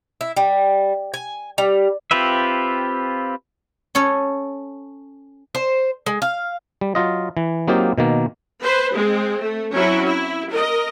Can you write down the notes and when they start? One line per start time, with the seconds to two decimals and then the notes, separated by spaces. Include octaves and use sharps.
0.21 E4
0.37 G3
1.14 G#5
1.58 G3
2.11 C4 F4 G4 B4 E5
3.95 C#4 A4 C#5
5.55 C5
6.06 G#3
6.22 F5
6.81 G3
6.95 F#3 F4 D#5
7.37 E3
7.68 F#3 A#3 C4 D#4 F4 G4
7.98 B2 D#3 A#3
8.62 B4 C5
8.94 G#3 C4
9.42 A3
9.73 F#3 C4 C#4 E4 F#4
10.05 E4
10.49 A#4 D#5